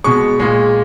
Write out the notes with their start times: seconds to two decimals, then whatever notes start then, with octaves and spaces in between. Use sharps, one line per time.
0.04 B2 G#3 C#6
0.39 A#2 G#3